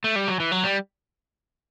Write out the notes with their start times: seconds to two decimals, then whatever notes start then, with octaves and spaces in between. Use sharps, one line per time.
0.04 A3
0.16 G3
0.28 F#3
0.40 E3
0.52 F#3
0.64 G3